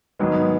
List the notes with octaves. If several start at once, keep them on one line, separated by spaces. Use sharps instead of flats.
G#2 D#3 F#3 G#3 B3